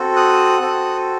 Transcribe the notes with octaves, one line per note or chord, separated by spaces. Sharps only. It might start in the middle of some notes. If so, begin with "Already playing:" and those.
Already playing: C4 F#4 A4
D#6 F#6
C4 F#4 A4